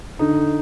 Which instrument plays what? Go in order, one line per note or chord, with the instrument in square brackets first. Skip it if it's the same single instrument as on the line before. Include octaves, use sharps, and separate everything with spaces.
[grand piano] D3 [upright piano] D#4